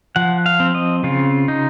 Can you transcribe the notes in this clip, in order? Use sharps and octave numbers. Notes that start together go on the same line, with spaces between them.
F3 F#5
F5
C4
D#5
C#3 F4
D#4